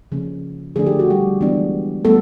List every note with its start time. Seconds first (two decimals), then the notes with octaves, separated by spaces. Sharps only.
0.12 C#3 F3 A#3 C#4
0.76 D3 F3 A3 D4 G#4
0.87 G4
0.99 F#4
1.10 G3 G4
1.41 E3 G#3 B3 D4
2.05 G3 A3 B3 A4